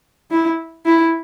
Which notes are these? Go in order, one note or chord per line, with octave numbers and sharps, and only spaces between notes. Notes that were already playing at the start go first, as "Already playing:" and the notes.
E4
E4